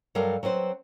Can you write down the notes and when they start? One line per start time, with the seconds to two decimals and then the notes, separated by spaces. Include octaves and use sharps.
0.15 G2 F#3 G3 A4 A#4 F5
0.43 F#3 C4 B4 C5